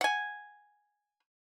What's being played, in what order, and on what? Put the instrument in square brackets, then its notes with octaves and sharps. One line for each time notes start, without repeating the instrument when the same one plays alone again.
[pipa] F#5 G#5